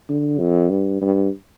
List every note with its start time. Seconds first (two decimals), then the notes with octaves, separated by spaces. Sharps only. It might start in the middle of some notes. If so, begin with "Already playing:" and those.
0.09 D3
0.39 F2
0.70 G2
1.01 G2